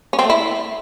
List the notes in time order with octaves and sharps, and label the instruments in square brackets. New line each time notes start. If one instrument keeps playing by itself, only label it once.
[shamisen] C#4
C4
A3
E4